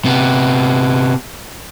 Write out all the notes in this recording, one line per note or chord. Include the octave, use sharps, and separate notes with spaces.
C3 B3